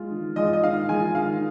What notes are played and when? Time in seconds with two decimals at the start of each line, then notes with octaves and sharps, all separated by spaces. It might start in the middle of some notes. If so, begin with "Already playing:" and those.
Already playing: G#3 F4 G#4
0.11 D#3
0.36 G#3 F4 G#4 D#5
0.53 D#5
0.63 D#3 F5
0.89 G#3 F4 G#4 G#5
1.15 D#3 F5